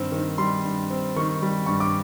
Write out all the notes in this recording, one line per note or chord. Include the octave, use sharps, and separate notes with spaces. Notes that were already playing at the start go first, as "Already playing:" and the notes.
Already playing: G2 D#3 G3 C4
D#3
G3 C6
G2
C4
D#3 C#6
G3
G2 C#6
D6